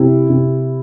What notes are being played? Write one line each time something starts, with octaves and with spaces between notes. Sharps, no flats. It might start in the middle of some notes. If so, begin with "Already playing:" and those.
Already playing: C3 E4
C3